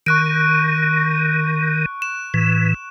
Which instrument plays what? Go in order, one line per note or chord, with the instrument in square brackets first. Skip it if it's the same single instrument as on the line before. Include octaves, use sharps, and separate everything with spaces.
[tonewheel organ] D#3 [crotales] C#6 F#6 D7
[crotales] E7
[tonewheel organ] A2 E3